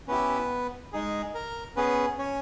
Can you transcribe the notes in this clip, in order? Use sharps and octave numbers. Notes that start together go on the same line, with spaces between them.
B3 C#4 E4 G4 B4
G#3 D#4 G#4
A#4
B3 C#4 G#4 B4
C#4 C#5